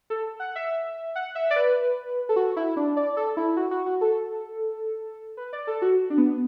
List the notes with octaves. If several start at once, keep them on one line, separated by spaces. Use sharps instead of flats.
A4
F#5
E5
F#5
E5
D5
B4
A4
F#4
E4
D4
D5
A4
E4
F#4
F#4
F#4
A4
B4
D5
A4
F#4
D4
B3